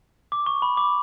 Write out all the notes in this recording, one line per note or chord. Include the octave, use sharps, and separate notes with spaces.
D6
C#6
B5
D6